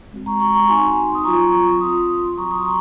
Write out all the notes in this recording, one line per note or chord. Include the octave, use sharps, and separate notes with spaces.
G#3 C4 F#4
A#5 C#6
A#5 C#6
A#5 C#6
C4 D#4 F#4 G#5 C6
D#6
F#3 C4 F4 A#5 C#6
C4 F4 C6 D#6
F#3 C4 F#4 A#5 C#6
C6 D#6
A#5 C#6